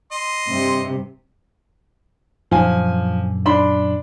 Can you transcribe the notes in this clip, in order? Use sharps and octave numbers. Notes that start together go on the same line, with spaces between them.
D#5 C6
G2 C3
F#2 A#2 D3 F3 G#5
D4 B5 C6